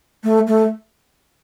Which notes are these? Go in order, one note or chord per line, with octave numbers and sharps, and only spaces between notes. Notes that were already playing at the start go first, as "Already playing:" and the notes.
A3
A3